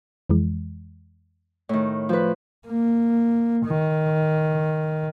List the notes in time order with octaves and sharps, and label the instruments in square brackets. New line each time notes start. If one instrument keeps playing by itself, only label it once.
[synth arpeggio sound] F2 E3 G#3
[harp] A2 D#3
F3 B4
[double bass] A#3
D#3